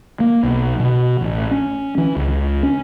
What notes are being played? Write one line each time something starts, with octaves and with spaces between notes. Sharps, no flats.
A#3
B1
B2
A1
C#4
E3
C#2
C#4